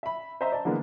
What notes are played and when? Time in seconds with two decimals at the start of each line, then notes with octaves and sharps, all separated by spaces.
0.03 E5 B5
0.41 C5 D#5 E5 A#5
0.52 D5 A5
0.65 D3 E3 G#3 A#3 B3